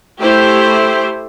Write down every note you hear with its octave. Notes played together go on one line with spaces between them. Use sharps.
A3 E4 G4 C5